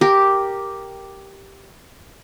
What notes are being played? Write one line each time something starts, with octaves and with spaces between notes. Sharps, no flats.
G4 A#4